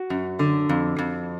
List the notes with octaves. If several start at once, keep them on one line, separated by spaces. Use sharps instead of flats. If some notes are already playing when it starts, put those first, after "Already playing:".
Already playing: F#4
F#2
D3
F2
F2